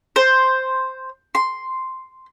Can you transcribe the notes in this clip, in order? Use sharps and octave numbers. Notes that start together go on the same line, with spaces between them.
C5
C6